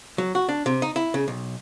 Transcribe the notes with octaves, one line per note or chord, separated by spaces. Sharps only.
F#3
F#4
D4
C3
D#4
E4
C#3
B1